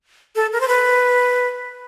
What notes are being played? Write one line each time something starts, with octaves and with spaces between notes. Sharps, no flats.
A4
A#4
C5
B4